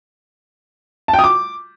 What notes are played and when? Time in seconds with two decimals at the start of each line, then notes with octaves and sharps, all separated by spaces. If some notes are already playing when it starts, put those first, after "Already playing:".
1.08 A5
1.13 G5
1.19 D#6
1.24 D6